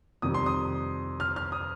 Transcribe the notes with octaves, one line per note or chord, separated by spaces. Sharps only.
F2 C3 D#3 G3 D#6
C6
D#6
F6
F6
D#6